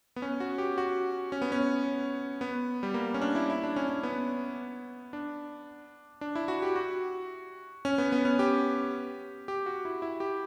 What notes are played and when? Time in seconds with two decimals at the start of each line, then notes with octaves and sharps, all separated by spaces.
0.16 B3
0.22 C#4
0.40 F#4
0.58 G4
0.78 F#4
1.32 C#4
1.42 B3
1.52 C#4
2.41 B3
2.83 G3
2.94 A#3
3.14 C#4
3.21 D4
3.35 E4
3.50 E4
3.63 D4
3.76 C#4
3.90 C#4
4.03 B3
5.13 D4
6.21 D4
6.35 E4
6.48 F#4
6.62 G4
6.76 F#4
7.85 C#4
7.98 B3
8.12 B3
8.25 C#4
8.39 G4
9.48 G4
9.66 F#4
9.85 E4
10.02 E4
10.20 G4